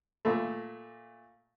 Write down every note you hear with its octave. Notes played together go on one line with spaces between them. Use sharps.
A#2 A3